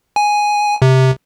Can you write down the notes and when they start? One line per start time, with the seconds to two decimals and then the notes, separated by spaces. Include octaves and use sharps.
0.16 G#5
0.82 C3